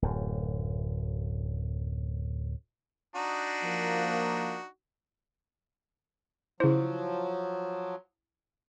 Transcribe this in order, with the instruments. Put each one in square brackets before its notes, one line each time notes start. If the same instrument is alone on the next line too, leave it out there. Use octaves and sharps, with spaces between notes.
[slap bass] D1 F#2
[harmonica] D4 D#4 F#4
[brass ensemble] F3 A#3
[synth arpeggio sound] C#3 C5 [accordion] F3 F#3 [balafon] E4